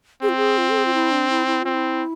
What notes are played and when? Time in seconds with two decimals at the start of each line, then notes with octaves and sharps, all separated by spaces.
0.22 C4 G#4
0.29 F4
0.36 G#4
0.58 F4
0.70 A4
0.77 G#4
0.85 F4
0.94 E4
1.12 D4
1.30 E4
1.47 E4
1.61 C4 F4
1.74 E4